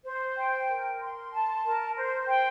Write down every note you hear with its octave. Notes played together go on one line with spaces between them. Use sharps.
C5
G5
A#4
C6
A5
A#4
C5
G5